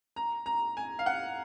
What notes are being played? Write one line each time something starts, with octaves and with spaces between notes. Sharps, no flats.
A#5
A#5
G#5
F5
F#5